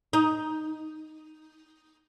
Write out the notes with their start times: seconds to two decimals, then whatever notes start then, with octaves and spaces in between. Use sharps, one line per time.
0.13 D#4